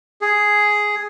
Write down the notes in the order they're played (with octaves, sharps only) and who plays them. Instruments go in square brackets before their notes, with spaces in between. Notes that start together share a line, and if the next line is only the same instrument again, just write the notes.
[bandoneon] G#4